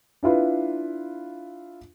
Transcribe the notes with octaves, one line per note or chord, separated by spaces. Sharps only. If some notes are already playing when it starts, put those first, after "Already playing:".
D4 E4 F4 B4